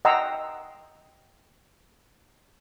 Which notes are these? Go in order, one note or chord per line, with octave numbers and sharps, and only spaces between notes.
D#5 F#5 G5 A#5 C6 E6